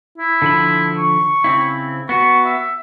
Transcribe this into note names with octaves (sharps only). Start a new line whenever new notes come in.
E4
D3 F3 B5
C#6
C#3 C4 E4
B3 F#4 C#6
E5